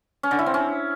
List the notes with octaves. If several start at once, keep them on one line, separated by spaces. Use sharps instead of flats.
C#4
D3
E4
C4
C#4